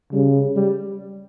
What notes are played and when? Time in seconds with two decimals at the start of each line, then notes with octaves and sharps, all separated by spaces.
0.13 C#3 G3
0.56 G3